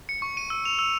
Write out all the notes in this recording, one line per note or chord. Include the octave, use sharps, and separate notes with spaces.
C#7
C#6
D#7
E6
F7
E6